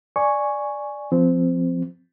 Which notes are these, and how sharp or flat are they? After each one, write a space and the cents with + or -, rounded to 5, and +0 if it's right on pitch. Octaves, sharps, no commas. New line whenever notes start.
D5 +5 G#5 +0 C#6 +0
F3 +0 C4 -15